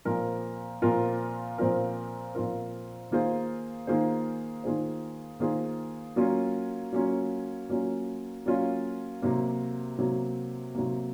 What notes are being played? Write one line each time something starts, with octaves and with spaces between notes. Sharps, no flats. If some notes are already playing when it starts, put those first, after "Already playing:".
A#2 F3 C4 F4 A#4
A#2 F3 C4 F4 A#4
A#2 F3 C4 F4 A#4
A#2 F3 C4 F4 A#4
D#3 A#3 F4 G#4 C5
D#3 A#3 F4 G#4 C5
D#3 A#3 F4 G#4 C5
D#3 A#3 F4 G#4 C5
F#3 A#3 C#4 F4
F#3 A#3 C#4 F4
F#3 A#3 C#4 F4
F#3 A#3 C#4 F4
C3 F#3 A#3
C3 F#3 A#3
C3 F#3 A#3